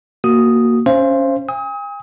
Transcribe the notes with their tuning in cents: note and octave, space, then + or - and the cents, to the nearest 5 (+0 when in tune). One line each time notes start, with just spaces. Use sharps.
A#3 +0 F#4 +0 D#6 +0
C#4 +0 C5 +10 F5 -35
G#5 -45 D#6 +35